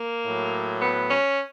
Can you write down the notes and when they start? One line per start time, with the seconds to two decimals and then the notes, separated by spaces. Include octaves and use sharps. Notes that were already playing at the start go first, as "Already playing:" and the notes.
Already playing: A#3
0.26 A2 F#3
0.82 B3
1.11 C#4